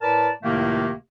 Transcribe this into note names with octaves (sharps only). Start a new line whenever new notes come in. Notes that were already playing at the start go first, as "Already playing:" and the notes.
A2 A#4 B4 D5 A5
C#2 A2 C3 D#3 A3 A#3